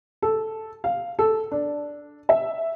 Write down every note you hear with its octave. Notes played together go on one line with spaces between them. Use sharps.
A4
F5
A4
D4
E5